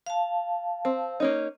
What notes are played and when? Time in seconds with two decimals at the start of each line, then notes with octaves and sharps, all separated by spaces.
0.06 F5 A5
0.85 C4
1.20 A#3 C#4 D#4